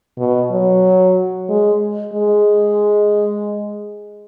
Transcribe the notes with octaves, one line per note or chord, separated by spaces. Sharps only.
B2
F#3
G#3
G#3